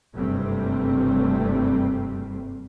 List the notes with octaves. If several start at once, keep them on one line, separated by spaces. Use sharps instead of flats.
F#1 G2 C3 G3 A3 C4